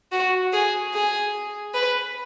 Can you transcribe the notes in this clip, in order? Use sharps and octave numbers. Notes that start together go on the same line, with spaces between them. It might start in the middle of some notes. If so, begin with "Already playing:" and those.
F#4
G#4
G#4
B4